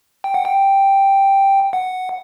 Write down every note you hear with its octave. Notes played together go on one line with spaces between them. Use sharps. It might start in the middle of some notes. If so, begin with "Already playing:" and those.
G5
F#5
G5
F#5